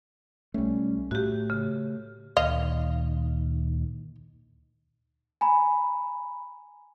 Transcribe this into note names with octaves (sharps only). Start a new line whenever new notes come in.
B1 G3 A3 C#4
A2 A3 F#4 G4
C#3
D2 A#2 D#3 D#5 F5
G#5 A#5 B5